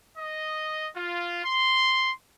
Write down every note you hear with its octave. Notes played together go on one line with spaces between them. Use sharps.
D#5
F4
C6